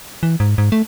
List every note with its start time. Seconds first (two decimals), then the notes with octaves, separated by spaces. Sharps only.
0.23 E3
0.40 G#2
0.58 G#2
0.72 A3